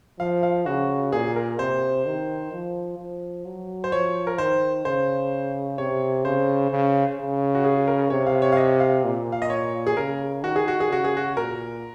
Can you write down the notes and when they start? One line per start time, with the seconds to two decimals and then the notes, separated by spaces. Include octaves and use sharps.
0.20 F3 F5
0.43 F5
0.66 C#3 F#4
1.12 A#2 G#4
1.36 A#4
1.59 C3 C5
2.06 D#3
2.53 F3
2.99 F3
3.45 F#3
3.84 C5
3.92 F3 C#5
4.27 A#4
4.38 D#3 C5
4.85 C#3 C5
5.78 C3 C#5
6.24 C#3 C5
6.71 C#3
7.18 C#3
7.55 F#4
7.64 G#4
7.88 A#4
8.10 C3 C#5
8.26 F5
8.42 C#5
8.52 F5
8.57 D#5
8.80 F5
9.04 A#2
9.32 F5
9.42 D#5
9.50 C#5
9.87 G#4
9.97 C#3 A#4
10.43 D#3 F#4
10.56 G#4
10.68 F#4
10.80 G#4
10.90 C#3 F#4
11.04 G#4
11.17 F#4
11.37 A#2 A#4